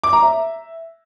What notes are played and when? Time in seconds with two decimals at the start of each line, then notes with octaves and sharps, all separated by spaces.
0.04 D6
0.13 A#5
0.22 E5